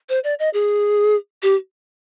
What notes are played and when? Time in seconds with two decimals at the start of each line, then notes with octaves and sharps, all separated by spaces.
0.09 C5
0.24 D5
0.39 D#5
0.53 G#4
1.42 G4